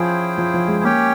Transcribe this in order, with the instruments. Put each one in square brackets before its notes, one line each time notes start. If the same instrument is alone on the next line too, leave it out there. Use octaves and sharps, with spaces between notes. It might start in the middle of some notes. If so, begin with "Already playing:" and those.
Already playing: [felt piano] F3 [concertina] C#4 E4 G#4 C5 G5
[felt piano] F3
F3
G#3
[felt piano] A#3 [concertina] C#4 G4 C#5 G5